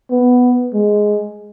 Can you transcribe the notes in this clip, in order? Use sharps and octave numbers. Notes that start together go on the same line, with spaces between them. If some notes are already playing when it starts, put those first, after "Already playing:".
B3
G#3